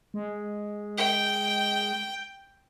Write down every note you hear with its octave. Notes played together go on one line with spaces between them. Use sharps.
G#3
G5